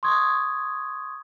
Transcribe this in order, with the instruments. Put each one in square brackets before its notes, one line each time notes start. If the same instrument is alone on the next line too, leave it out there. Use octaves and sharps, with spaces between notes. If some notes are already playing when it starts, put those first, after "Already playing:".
[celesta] C6 C#6 D#6 G#6